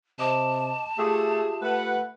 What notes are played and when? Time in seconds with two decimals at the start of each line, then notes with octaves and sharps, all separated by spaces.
0.19 C3 D#5 A5 D6
0.99 A3 F4 G4 G#4 E5
1.62 A3 B4 F#5